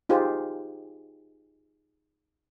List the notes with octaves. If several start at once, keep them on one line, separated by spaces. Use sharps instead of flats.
D#4 F4 G4 G#4 C5